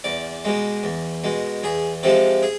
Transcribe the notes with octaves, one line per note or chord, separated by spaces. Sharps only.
E2 D5
B2 G#3
E2
B2 G#3
E2 G#4
C3 F3 G#3 A4
G#4